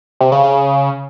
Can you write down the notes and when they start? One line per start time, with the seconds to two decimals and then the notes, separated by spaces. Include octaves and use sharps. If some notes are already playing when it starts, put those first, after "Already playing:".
0.20 C3
0.32 C#3
0.43 C#3